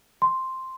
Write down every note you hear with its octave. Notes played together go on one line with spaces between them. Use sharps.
C6